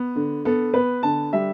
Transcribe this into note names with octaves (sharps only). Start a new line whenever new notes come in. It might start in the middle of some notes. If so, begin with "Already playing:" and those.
Already playing: B3
D3
B3 A4
B3 B4
D3 A5
G3 E5